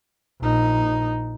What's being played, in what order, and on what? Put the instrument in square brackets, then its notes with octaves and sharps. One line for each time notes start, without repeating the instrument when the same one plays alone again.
[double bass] A#1 D#4